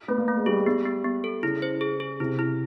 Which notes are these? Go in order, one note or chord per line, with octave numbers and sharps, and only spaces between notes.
A3 B3
A#3
A3
G#3
G3 G#4
G#3
G3 B3
B3
B3
A4
C#3 E4
C5
G#4
G#4
C3 E4
E4